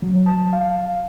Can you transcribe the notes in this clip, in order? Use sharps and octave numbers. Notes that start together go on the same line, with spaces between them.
F#3
A5
F5